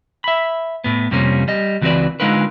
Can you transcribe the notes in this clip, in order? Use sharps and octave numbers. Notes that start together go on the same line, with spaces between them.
E5 B5
A2 B3
F2 C3 G3 A#3 C#4
G3 D#5
C#2 E3 C4 F#4 B4 D5
D3 G#3 D#4 F4 A#4 B4